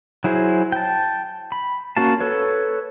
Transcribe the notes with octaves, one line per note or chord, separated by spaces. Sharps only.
F#3 E4 G#4 C5
G5 A5
B5
A#3 C#4 F#4 F5 A5
A4 B4 C#5